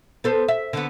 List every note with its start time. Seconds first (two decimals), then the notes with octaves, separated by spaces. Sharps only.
0.24 B3 A4 C5
0.48 E5
0.73 D3 B3